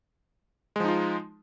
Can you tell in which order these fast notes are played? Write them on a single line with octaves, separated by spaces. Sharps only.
G#3 F3 D#4 F4